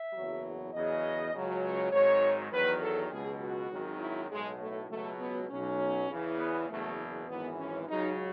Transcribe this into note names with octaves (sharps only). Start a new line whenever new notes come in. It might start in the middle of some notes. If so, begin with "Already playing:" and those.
Already playing: E5
F#1 E2 B2 F#3
E2 C#3 F#3 D#5
C#2 C#3 F#3
C#5
G#1 G#2 D#3 F#3 C#5
E2 D#3 F#3 B4
A4
C#2 B2 F#3 G#4
F#4
G#1 F#2 D#3 F#3
E4
B1 A2 F#3 G#3
A3
C#2 B2 F#3 A3
B3
B1 B2 F#3 C#4
E2 C#3 E3
B3
F#1 E2 B2 F#3 A3
G#1 F#2 E3 B3
C#4
C#2 C#3 F#3 D#4